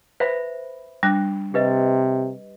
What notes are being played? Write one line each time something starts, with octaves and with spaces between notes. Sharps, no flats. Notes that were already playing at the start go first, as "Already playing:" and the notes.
B4 C5 E5 B5
G3 D4 F#6
C3 G4 B4 D#5